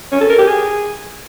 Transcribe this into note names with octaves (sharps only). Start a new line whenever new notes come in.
C#4
A4
A#4
G4
G#4